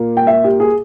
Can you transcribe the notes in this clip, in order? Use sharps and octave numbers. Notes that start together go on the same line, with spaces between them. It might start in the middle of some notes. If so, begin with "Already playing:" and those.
Already playing: A#2 A#3
G5
E5
G4
G#4